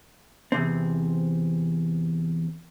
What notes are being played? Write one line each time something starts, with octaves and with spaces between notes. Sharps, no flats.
E2 C3 C4